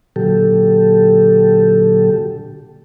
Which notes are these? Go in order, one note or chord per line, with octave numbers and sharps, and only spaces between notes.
A#2 D3 F#3 G4 A4